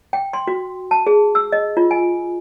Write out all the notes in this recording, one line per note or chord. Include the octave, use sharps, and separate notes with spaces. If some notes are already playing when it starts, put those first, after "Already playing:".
G5
C6
F#4
A5
G#4
E6
D#5
F4
G#5